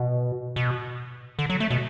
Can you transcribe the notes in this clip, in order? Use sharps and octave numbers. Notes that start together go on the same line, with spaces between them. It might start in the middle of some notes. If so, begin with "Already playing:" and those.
Already playing: B2
B2
D3
F#3
A3
B2